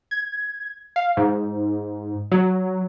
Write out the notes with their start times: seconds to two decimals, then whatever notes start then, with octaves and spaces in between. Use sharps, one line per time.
0.11 G#6
0.96 F5
1.17 G#2
2.32 F#3